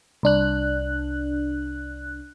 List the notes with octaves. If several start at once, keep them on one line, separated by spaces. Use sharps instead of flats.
C2 D4 F#6